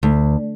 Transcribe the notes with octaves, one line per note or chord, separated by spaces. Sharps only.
D2